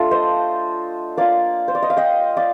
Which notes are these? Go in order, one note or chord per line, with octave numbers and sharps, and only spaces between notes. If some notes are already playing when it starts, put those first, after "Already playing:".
Already playing: A3 D4 F4 A4
C5 D#5
A#3 F4 D5 F5
C5
D5
D#5
F5
D#5 G5
D5 F5